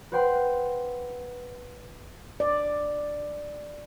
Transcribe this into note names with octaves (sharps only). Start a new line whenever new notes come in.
B4 C5 F#5 G5 C6
D5